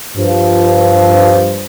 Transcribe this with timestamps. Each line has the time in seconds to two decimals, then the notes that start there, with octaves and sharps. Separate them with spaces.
0.17 G2 F3